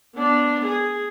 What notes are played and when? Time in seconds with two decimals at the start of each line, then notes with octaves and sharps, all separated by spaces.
0.16 B3 D4
0.65 G#4